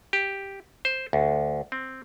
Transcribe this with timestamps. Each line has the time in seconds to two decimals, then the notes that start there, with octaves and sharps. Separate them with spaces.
0.13 G4
0.85 C5
1.13 D2
1.72 C4